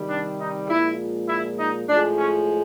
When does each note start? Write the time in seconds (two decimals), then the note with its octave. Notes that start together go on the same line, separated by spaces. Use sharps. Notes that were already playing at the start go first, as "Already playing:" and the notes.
Already playing: C3 D#3 G3
0.09 D4
0.39 D#4
0.68 A#2 F3 G#3 E4
1.28 E4
1.58 D#4
1.88 A2 F3 G#3 D4
2.17 C#4